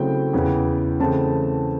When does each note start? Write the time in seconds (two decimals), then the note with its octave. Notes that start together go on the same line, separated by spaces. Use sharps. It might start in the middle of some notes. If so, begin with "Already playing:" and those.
Already playing: C#3 F#3 A3 C4 E4 G5
0.33 E2 C#3 E3
1.00 C#3 E3 A3 C4 A5